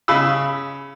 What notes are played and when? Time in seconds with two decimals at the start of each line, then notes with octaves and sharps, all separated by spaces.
0.08 C#3 B5 E6